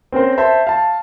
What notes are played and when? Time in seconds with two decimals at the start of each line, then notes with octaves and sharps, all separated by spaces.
0.12 C4 C#4 A#4 C5
0.38 C5 E5 A5
0.67 F5 A5